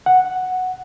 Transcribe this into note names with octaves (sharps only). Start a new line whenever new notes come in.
F#5